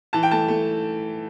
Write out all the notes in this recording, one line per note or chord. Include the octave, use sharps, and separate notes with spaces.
E3 A5
G5
A3 A5
A3